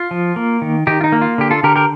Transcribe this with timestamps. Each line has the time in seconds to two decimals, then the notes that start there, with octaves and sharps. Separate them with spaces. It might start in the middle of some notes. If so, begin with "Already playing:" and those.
Already playing: F4
0.11 F3
0.36 A#3
0.62 D#3
0.87 D#3 D#4 G4
1.01 F4
1.04 D#4
1.12 A#3
1.22 F4
1.38 D3 G4
1.51 F4 A4
1.63 D3 G4 A#4
1.76 G4 A#4